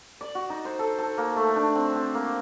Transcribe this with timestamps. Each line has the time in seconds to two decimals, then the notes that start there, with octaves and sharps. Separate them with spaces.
0.21 D5
0.35 F#4
0.50 D#4
0.65 C5
0.79 A4
0.98 A4
1.18 A#3
1.36 A3
1.56 D4
1.76 C4
1.95 C4
2.15 A#3